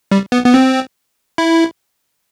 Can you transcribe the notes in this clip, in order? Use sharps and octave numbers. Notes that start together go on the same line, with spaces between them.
G3
B3
B3
C4
E4